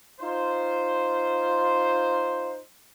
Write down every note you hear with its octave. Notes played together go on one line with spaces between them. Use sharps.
D#4 F4 C5